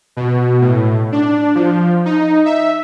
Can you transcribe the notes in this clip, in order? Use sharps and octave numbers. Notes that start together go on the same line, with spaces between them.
B2
A2
D4
F3
D#4
E5